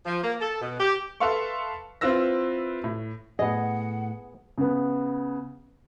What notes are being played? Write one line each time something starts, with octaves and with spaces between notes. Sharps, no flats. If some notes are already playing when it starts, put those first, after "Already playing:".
F3
A#3
A4
B2
G4
A4 B4 E5 F5 C6 C#6
C4 E4 F4 B4 E6 A#6
A2
A2 B3 G#4 D#5 F#5
C#3 B3